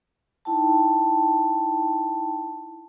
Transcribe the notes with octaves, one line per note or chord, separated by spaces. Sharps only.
D#4 E4 G5 A5